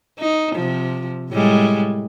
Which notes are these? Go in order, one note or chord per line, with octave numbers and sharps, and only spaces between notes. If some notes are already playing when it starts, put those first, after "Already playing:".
D#4
C3 F3
A2 G3 G#3